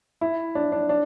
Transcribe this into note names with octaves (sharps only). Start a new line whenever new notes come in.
E4
D4
D4
D4